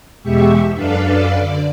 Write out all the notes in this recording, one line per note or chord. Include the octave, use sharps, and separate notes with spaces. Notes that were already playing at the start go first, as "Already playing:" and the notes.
E2 B2 G#3 G4 E5 C#6
F#2 D4 A4 B4 D5 F5
D3 D5